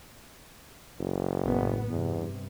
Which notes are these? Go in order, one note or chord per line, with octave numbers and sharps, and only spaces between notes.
F#1
A1 A2 B3
E2 G2 C3